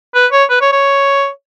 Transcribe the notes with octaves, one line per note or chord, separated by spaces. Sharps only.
B4
C#5
B4
C#5
C#5